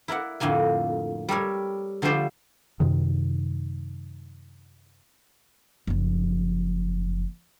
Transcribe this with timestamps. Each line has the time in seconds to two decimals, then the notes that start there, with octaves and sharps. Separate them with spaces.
0.08 E4 A#4 D5 F#5
0.40 F2 A2 D3 A#3 G#5
1.29 G3 A4 A#4 C#5
2.02 D3 F3 G3 A3 C5 D5
2.80 F#2 C3 D#3
5.87 F#1 F3